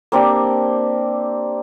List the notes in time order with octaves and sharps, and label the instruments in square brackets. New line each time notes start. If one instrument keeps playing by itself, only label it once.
[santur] A#3 C4 D4 G4